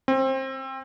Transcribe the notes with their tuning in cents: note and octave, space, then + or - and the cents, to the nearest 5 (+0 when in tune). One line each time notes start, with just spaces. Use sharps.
C4 +25